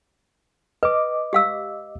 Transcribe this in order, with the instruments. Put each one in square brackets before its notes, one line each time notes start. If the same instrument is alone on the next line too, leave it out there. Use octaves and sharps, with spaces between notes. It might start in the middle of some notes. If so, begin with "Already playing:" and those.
[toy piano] B4 [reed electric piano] D#5 D6
[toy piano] G4 F5 E6